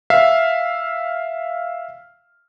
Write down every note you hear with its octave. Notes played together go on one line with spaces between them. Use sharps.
E5 F5 F6